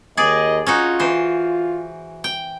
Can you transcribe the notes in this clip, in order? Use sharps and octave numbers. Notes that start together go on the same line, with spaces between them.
D#2 G#4 D5 D#5
C#4 D#4 F4 F#4
E3 C5
G5